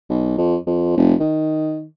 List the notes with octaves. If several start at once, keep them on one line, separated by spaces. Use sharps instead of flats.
B1
F2
F2
F1
D#3